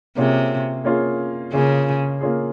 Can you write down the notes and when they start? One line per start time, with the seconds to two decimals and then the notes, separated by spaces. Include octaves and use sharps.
0.17 C3 A#3 C#4 F4 G#4
0.84 A#3 C#4 F4 G#4
1.53 C#3 A#3 C#4 F4 G#4
2.21 A#3 C#4 F4 G#4